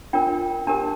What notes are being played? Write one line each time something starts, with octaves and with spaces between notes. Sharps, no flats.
D4 F4 A#4 G5
D4 G4 A#4 A5